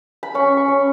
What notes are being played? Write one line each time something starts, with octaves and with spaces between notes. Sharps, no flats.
B5
C#4 C#6
C#6
C#4